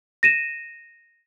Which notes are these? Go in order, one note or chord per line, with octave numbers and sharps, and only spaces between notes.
A#6 D#7 E7